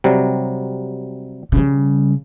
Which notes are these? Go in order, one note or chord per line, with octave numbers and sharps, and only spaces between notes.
C3 F#3 G3
C#3 G3